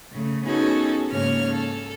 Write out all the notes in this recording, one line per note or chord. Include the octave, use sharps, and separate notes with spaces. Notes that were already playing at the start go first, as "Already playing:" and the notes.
C#3 A3
B3 C#4 D#4 F#4 G#4 A4
G#2 C#3 A#3 C#4 C#5 F6
A4